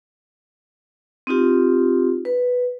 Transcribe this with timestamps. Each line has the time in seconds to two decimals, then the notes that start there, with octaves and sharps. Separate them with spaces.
1.27 C4 D#4 F4 G4
2.25 B4